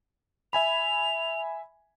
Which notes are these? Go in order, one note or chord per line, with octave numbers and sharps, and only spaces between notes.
E5 G#5 B5 F7